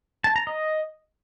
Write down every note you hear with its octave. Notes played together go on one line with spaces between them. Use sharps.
A5
A#5
D#5